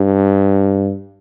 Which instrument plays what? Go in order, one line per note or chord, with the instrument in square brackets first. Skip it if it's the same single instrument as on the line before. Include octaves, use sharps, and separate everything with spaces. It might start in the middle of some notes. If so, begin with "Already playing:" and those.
Already playing: [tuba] G2